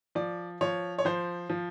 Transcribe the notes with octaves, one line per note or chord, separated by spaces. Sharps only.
F3 D5
F3 C#5
C#5
F3 C5
F3